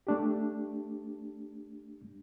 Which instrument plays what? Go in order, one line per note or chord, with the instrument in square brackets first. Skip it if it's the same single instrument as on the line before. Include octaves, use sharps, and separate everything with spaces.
[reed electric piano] A3 D4 G4